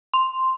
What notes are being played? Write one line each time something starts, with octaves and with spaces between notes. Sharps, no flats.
C6